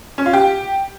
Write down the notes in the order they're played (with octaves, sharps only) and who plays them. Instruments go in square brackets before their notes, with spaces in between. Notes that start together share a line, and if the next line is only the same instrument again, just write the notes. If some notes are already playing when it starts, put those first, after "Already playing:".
[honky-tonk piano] C#4
F4
G4